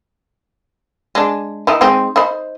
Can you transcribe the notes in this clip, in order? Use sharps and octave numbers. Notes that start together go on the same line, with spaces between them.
G#3 D4
D#3 D#4 E4
G#3 C4 D#4
D#4 C5 B5